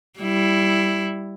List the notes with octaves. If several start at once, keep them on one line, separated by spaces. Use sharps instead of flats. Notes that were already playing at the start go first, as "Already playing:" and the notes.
G3 E4